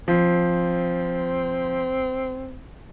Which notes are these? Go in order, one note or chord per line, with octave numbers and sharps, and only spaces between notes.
F3 C4